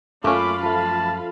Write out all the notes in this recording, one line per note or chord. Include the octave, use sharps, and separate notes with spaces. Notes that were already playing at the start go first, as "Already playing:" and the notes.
F#2 A3 A#3 C#4 F4 F5 B5 D6
F3 A3 A5